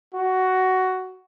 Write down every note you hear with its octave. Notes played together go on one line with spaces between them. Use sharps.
F#4